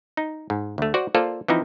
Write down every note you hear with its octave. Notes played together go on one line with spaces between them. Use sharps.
D#4
G#2
D2 A3
F#4 C5 D5 F#5
A#3 F4 A4 C5 D5
E3 F3 C4 D#4 E4